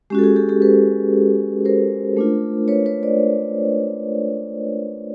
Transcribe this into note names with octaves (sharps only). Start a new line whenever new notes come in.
G#3 C#4 F#4 G4
A4
F#4 G#4
G4 A4
G4 A4
A4 B4
A#4 C5
A3 D4 F4
B4 C#5
B4 C#5
C5 D5